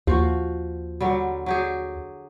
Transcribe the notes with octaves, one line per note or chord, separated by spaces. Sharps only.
D#2 F3 F#4
D3 F#3 G3
F#3 G4 G#4